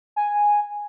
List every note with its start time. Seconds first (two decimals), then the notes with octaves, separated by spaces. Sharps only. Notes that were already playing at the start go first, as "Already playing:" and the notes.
0.16 G#5